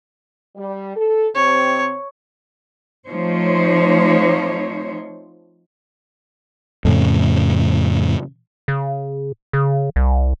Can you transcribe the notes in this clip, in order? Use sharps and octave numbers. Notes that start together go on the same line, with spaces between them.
G3
A4
C3 C4 C#5
F3 A3 C4 D#4 C5 C#5
F2 A2 C#3
C#3
C#3
C2